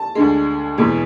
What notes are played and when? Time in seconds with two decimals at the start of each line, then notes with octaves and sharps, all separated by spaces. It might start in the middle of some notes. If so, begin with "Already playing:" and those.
Already playing: A5
0.15 D2 D3 G#3
0.78 E2 B2 G#3